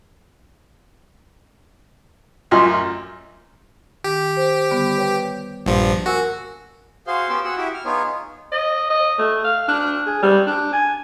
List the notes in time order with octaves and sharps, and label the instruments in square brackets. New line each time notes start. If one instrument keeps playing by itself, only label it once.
[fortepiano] A1 F#2 F6 [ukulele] F4 D#5 [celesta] C6
[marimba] D#3 [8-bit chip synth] G4
[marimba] C5
D3 G3 B3
B4 C#5 G5
[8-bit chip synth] A#1 G2 F3
[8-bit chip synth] F#4 [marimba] A#4 G#5 E6
[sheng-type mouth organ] F#4 G#4 C5 F5 C6
B3 C#4 F4 G4 E6
F#4 G#4 F#5 E6
E4 F#4 G4 E5
F6
B3 D#4 F4 G#4 C#5
[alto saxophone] D#5
D#5
A3
F5
D4
G#4
G3
D4
G#5